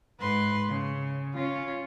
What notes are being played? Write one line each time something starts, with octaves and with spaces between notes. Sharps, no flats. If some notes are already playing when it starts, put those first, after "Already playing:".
G#2 B4 C6
C#3
C#4 F4